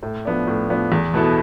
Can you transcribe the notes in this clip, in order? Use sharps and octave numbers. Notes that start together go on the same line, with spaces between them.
A2
F3 B3 D4
A2
F3 B3 D4
E2
B2 B3 E4 A4